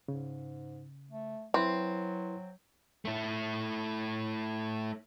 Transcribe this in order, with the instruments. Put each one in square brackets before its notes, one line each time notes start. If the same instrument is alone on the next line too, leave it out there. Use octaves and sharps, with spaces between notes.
[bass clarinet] G#2 [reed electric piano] C#3
[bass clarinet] A3
[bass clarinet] F#3 [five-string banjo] C4 [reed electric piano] E4 B4 C6
[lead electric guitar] A3 E4